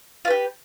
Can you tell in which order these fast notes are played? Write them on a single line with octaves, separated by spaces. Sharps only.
F4 B4 G4